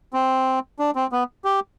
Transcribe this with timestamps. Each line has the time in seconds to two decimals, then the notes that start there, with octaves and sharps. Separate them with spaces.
0.13 C4
0.79 D4
0.96 C4
1.12 B3
1.45 G4